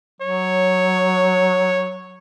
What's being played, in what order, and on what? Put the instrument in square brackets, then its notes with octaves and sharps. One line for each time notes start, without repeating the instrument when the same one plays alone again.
[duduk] F#3 [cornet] C#5